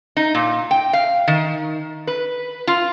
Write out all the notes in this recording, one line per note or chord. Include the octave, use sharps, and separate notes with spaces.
D#4
A#2
G5
F5
D#3
B4
F4